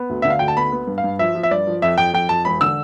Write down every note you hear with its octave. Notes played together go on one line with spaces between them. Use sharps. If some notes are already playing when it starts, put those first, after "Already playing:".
Already playing: B3
D2
D3 E5
F5
D2 G5
A5
B3 B5
B3
G2
F5
G2
F3 E5
F3
E5
G2 D5
F3
F2 E5
F2 G5
F2 G5
F2 A5
E1 B5
D3 E6